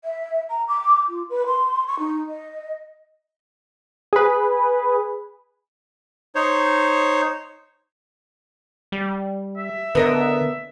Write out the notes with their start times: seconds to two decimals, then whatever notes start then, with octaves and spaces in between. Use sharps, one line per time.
0.04 E5
0.50 A#5
0.68 D6
1.09 F4
1.30 B4
1.46 C6
1.87 C#6
1.99 D#4
2.28 D#5
4.13 G#4 B4
6.35 D#4 C5 C#5
8.92 G3
9.58 E5
9.95 D3 B3 A#4 D#5